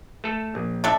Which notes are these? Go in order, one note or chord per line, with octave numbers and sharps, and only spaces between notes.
A3 A4
A#1
D4 A4 E5